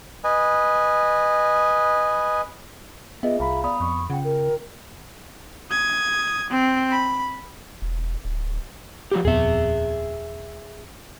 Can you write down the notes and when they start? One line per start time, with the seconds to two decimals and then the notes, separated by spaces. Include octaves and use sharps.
0.24 B4 D#5 G#5
3.23 B3 F4 G#4 D#5 E5
3.40 C2 F5 A#5 B5
3.64 B3 D5 B5 D#6
3.80 F2 C#6
4.10 C#3 F4 F#5 G5
4.24 A#4
5.70 D#6 G#6
6.50 C4
6.91 B5
7.82 E1
8.25 D1
9.11 F3 F#3 G4
9.25 D#1 F2 B3 G#4 E5